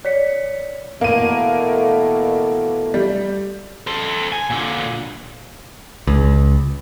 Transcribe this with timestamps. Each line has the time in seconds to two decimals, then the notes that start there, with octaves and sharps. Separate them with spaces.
0.05 C#5 D5 B6 C#7
1.01 B2 E3 A3 A#3 D#7
2.94 G3
3.87 A4 C5
4.32 G#5
4.50 A#2 D3
6.07 C#2